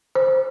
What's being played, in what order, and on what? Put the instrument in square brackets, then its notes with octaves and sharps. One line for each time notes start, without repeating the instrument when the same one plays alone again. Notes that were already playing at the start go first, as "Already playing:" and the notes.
[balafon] C5